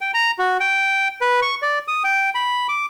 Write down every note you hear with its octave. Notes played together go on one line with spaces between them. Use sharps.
G5
A#5
F#4
G5
B4
C#6
D5
D#6
G5
B5
D6